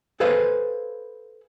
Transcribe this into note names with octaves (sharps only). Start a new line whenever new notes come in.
G#4 A4 B4 C5 F5